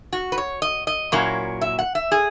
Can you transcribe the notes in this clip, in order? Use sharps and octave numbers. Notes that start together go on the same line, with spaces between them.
F#4
B4
C#5
D#5
D#5
A#2 F#3 A#3 C#4 E4
E5
F#5
E5
G#4